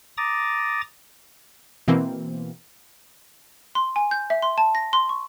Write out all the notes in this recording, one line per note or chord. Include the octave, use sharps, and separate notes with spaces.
A#5 D6 D#6 A6
B2 E3 A#3 C4
C6
G#5
G6
E5
C6
A5
A#6
C6
C#6